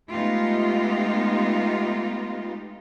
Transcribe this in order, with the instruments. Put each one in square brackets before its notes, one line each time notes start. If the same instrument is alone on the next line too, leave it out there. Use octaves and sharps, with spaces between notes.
[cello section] G#3 A3 B3 D#4 F4 G4